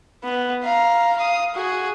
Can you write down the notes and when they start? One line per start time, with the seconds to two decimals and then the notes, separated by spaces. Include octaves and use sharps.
0.24 B3
0.64 F5 A#5
1.17 F5 D#6
1.55 F#4 G#4